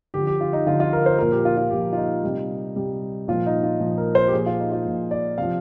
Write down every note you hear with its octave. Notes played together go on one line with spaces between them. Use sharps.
D3 F3 G4
G4
F4
D#4
D3 F3 F4
F4
A#4
C5
A#2 F3 A#4
G4
F4
F4
A#2 F3 G4
F4
D#4
C3 G3
C3 G3
A#2 F3 F4
D#4
F4
A#2 F3
A#4
C5
G4
A#2 F3 G#4
F4
D#4
F4
A#2 F3
D5
C3 F3 F5